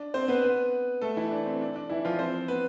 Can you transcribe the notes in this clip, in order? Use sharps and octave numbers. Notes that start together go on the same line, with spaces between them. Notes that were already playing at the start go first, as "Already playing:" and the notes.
Already playing: D4
C4 C5
B3 B4
B3 B4
A3 A4
E3 E4
D4
C4
D4
D4
E3 E4
F3 F4
C4 C5
B3 B4